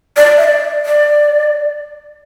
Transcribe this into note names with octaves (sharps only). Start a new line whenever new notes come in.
D5
E5
D5
D5